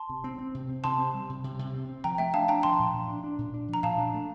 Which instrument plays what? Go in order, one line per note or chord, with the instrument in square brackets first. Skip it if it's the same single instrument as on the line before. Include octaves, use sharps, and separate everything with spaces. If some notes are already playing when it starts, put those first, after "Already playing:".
Already playing: [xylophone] A5 C6
[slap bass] C3
C4
C4
C3
C4
[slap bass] C3 [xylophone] A5 C6
[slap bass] C4
G3
C3
C3
C3
C4
C4
[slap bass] F3 [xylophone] G5 A#5
[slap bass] A3 [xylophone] E5 G5
[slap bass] D4 [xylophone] F5 A5
[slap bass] D4 [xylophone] G5 A#5
[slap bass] F3 [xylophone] A5 C6
[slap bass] A#2
F3
D4
D4
A#2
D4
F3
[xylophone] A#5
[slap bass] A#2 [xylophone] F5 A5
[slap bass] D4
A3